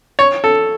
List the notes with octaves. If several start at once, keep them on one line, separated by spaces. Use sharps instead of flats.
C#5
A4